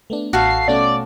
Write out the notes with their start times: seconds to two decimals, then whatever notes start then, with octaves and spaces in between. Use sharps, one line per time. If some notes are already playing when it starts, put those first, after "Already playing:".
0.10 A3 B3 D4
0.33 A1 F#4 A4 F5 C7
0.68 B2 A3 C#4 D5